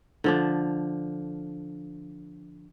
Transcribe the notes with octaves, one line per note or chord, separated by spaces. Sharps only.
D3 F3 D4